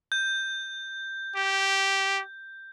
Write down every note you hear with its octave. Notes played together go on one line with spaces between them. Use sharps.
G6
G4